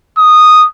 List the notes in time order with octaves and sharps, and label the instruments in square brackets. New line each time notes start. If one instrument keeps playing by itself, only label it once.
[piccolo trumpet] D#6